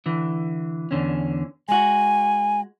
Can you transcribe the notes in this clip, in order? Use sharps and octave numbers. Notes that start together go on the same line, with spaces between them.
D3 E3
E2 D3 C#4
G#3 F#4 G#5